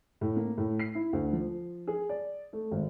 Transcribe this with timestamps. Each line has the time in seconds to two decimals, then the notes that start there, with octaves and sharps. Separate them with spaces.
0.21 A2
0.36 A#3
0.58 A2
0.80 C7
0.95 E4
1.13 D2
1.33 F3
1.87 G#4
2.09 D5
2.53 A3
2.71 G#1